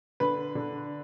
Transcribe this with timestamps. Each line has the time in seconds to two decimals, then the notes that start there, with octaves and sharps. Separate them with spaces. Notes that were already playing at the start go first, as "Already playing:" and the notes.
0.20 D3 B4
0.55 D3